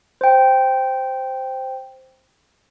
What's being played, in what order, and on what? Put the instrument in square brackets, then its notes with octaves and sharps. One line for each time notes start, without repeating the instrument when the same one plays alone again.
[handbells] C5 G5